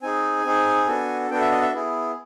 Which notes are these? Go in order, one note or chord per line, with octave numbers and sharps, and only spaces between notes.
C4 D#4 G#4 G#5
C4 D#4 G#4
B3 D4 F#4 A4
B3 D4 F#4 A4 G5
E5
D#5
E5
B3 E4 G#4